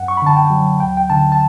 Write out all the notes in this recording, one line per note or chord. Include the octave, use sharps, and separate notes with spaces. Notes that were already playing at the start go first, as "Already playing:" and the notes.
Already playing: F#2 F#5
C#6
B5
D3 A5
G5
F#3
D2 G5
G5
D3 A5
A5